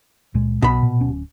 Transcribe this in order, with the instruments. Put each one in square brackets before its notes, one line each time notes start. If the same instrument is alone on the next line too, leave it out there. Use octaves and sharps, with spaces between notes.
[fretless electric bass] C#2 A#2 G#3
[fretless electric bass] B1 [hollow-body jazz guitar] B2 B5
[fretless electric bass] A#2
D1 C#4